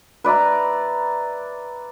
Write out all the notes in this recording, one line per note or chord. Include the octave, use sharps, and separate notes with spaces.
B4 D5 E5 A#5